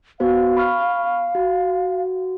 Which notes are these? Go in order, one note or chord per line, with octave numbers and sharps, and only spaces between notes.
B3 F#4 C5 F5
B5 C#6 F6
F#4